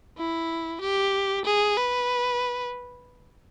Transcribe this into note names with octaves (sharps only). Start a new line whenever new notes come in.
E4
G4
G#4
B4